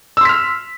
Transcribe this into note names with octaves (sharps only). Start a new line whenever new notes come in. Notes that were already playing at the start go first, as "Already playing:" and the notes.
C6 E6 F6 B6